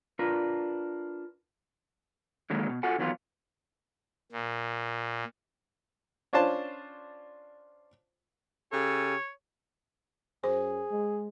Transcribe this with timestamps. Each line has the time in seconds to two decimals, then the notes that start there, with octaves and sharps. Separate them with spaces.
0.19 D4 F4 A#4 B4
2.50 D3 D#3 F#3 G#3 A#3
2.69 B2
2.83 F4 F#4 A4 F#5 G#5
2.98 E2 D#3 F#3 B3 F4
4.32 A#2
6.33 C#4 D4 F4 C5 A5
8.72 C#3 G4 A4 C#5
10.44 F#2 G#4 C5
10.91 G#3